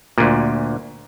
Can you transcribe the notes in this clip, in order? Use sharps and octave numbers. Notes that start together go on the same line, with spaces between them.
D2 A#2